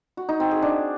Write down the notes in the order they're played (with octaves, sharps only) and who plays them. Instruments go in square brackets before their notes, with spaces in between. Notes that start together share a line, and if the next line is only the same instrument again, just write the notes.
[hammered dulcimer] F#4
D#4
C4
G#4
D4